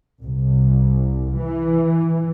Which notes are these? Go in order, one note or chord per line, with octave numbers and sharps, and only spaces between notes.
C2
E3